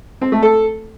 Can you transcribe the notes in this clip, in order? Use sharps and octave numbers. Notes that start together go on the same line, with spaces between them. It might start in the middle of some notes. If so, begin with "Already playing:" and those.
C4
A3
A4